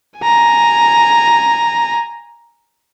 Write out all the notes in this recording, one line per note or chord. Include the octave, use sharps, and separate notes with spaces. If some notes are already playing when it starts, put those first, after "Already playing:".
G#5 A#5